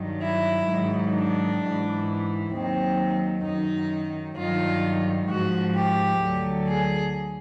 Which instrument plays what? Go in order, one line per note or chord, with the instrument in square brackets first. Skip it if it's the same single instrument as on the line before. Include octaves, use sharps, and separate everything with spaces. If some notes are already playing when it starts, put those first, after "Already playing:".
Already playing: [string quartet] G2 D#3 F#3
E4
G#2 D#3 F#3
D4
G#2 E3
D#2 D#3 F#3 C4
F#2 D#3 F#3 D#4
G2 D#3 F#3 F4
G#2 F3 F#4
G4
D2 D3 F#3
G#4